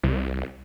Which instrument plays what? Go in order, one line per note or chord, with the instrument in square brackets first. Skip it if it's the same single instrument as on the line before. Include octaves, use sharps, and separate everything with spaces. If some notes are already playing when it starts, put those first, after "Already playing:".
[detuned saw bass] C2